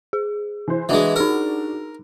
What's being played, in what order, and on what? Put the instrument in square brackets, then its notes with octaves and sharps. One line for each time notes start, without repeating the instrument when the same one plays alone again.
[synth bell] G#4
[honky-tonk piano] E3 C5
[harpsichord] E3 G#3 [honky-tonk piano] D4 F#4
[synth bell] D#4 G#4 [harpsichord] A#4